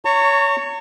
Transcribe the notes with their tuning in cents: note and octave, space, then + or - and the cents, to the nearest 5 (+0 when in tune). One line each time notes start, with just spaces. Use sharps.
C#5 +20 A#5 -40 C#6 +0